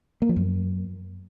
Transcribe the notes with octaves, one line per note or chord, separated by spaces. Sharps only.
A#3
F3
F#2